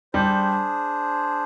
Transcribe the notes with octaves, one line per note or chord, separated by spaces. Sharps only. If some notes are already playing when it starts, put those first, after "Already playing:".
G3 D4 G#4 C5